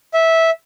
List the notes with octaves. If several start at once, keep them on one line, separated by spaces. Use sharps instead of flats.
E5